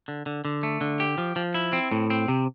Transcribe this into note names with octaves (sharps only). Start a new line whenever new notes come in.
D3
D3
D3
A3
D3
G4
F3
F3
E4
C4
A2
C4
C3